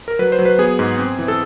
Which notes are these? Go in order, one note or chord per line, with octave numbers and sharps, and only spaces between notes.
A#4
F#3 B4
C5
F#3
B4
B3 G#4
G#2
C4
E3
A4